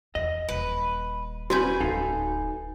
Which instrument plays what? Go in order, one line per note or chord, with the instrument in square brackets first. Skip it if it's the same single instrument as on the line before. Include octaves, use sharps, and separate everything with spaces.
[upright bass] E2 [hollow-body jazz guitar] D#5
[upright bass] D#1 [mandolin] B4
[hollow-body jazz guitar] C2 C4 C#4 [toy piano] F#4 [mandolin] B4 G#5 G6
[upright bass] D1 [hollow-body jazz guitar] D#4 A4 F5